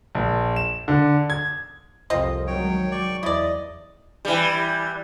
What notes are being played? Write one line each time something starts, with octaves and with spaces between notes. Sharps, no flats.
A#1
E7
D3
G#6
C2 F2 C4 F4 D#5
D#3 F#3 G#3 C#5 G5
D5 G5 C#6
E2 E4 D5 D#5
E3 G3